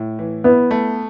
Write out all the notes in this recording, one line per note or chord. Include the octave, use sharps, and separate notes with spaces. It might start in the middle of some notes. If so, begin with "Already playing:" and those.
Already playing: A2
E3
B3 E4
A3